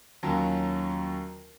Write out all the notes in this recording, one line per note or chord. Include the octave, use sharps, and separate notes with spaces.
D#2 F#3 C#4 F4 A5 A#5